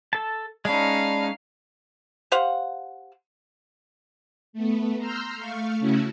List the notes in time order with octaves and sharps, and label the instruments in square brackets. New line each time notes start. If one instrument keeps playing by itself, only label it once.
[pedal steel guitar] A4 A5
[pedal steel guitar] G#3 C#4 [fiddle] D#4 F5 [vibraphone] D5 A5 B5
[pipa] G4 C5 F5 F#5
[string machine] A3 B3
A#5 C6 E6 F6 G6
A3 F5 C#6
C#3 A3 C#4 E4 F#4